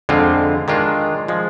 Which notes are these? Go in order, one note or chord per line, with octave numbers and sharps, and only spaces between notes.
F2 D3 G#3 C4 F4
D#3 G#3 D4 F4
F3 G#3